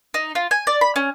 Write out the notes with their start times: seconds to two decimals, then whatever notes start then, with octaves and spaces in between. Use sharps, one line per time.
0.14 D#4
0.35 F4
0.51 G#5
0.67 D5
0.81 B5
0.96 C#4